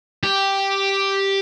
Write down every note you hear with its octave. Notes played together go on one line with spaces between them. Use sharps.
G4